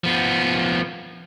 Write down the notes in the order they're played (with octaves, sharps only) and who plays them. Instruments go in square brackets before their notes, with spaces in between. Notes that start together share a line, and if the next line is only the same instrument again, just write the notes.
[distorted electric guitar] F3 B3